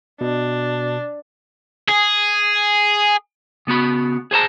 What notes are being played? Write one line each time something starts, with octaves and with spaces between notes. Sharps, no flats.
B2 D4
G#4
C#3 B3 F#4 B5
G#4 C5 A5 A#5